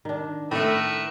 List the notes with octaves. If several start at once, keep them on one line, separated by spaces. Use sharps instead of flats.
D#3 D4
A2 A3 A#4 B4 E5